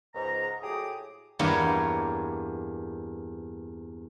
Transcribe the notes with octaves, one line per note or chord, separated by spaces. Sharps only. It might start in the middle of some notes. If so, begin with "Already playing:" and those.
C#2 G#2 A#5
A2 F#3 G4 G#4 D6 D#6
E2 G2 A#3 C#5